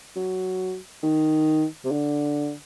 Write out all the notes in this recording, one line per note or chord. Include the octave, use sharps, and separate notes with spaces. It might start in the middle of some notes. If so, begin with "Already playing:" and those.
F#3
D#3
C3
D3